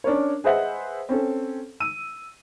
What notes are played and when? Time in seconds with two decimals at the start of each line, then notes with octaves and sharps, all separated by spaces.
0.04 C#4 D4 A#4 C#5
0.44 G#4 B4 C5 D#5 E5 F#5
1.09 C4 C#4 A4
1.80 E6 D#7